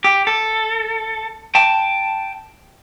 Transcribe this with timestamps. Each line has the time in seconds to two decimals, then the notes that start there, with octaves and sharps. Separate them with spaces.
0.04 G4
0.27 A4
1.55 G5 A5